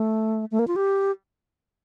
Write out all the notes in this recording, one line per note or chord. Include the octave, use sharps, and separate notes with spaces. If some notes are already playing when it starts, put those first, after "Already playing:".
Already playing: A3
A3
A#3
F4
G4